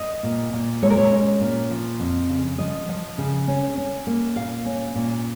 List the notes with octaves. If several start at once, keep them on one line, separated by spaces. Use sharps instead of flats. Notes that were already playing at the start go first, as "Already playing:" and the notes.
Already playing: D#5
A#2
A#2
G#3 C#5
A#4
C#5
C#4
A#2
F3
F2
C#3
F3 D#5
F3
C#3
C#4
C#4
A#3
A#2 F5
C#4
A#2